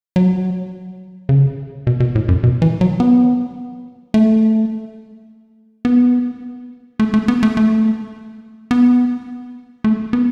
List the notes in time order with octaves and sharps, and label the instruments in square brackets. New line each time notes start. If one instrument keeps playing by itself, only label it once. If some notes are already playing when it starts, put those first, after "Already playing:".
[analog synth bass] F#3
C#3
B2
B2
A2
F#2
B2
E3
F#3
B3
A3
B3
A3
A3
B3
A3
A3
B3
A3
B3